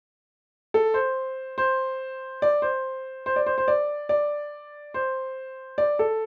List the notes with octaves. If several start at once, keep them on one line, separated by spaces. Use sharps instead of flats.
A4
C5
C5
D5
C5
C5
D5
C5
C5
D5
D5
C5
D5
A4